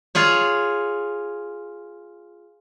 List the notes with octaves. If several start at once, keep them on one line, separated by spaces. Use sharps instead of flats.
F4 G#4 C#5